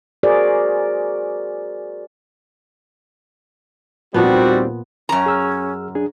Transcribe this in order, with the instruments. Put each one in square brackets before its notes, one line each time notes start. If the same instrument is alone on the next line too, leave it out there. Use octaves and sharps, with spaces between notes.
[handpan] F#4 G#4 A#4 C5 D5
[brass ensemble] D#2 G3 C4 [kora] A#2 F3 B3 [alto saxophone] F#4
[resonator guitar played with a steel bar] F#2 A#5 [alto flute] C#4
[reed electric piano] G#4 E6 F6
D4 G#4